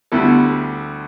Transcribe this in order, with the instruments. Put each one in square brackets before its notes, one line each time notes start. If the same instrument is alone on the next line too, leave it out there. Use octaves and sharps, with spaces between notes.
[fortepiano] D2 D3 G3 E4 A4 [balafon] B3